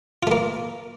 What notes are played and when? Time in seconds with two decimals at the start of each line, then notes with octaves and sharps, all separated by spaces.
0.23 F4
0.27 A3
0.31 A#3